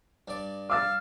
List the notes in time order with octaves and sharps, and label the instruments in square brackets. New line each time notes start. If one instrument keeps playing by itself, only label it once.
[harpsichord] G2 D5
[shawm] F5 [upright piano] D6 E6 A6